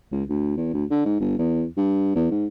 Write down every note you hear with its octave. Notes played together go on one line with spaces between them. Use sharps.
C#2
D2
E2
D2
D3
G#2
G1
E2
G2
E2
G#2